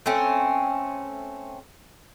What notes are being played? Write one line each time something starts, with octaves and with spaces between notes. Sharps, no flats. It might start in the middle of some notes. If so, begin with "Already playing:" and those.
A3 C4 C#4